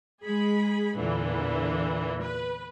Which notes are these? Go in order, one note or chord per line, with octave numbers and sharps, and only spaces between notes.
G#3 G#4 B5
E2 A#2 D3 E3
B4